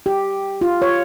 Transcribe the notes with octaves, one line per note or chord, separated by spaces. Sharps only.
G4
F4
C#5